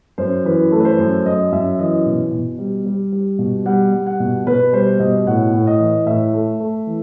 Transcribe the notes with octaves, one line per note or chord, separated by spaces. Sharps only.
F#2 C5
E3 B4
A3
B4
C5
F#2
F#2 D#5
F#2 E5
E3 D#5
B2
B2
G3
G3
G3
B2
G3 F#5
G3
F#5
B2
B2 B4
G3 C5
B2 D#5
A2 F#5
A2
D#5
E3
A2 E5
A3
A3
E3